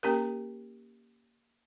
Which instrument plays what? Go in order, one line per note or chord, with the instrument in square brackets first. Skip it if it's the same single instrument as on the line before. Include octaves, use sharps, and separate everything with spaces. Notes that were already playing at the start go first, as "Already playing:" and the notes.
[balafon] A#3 C#4 G4 A#4